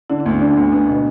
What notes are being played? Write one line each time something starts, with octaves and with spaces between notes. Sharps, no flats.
D3 E4
D4
D2 B3
D3 D4
D2
B3 D4
B2